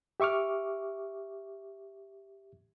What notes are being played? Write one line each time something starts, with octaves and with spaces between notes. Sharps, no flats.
G4 E5 C#6 D6 F6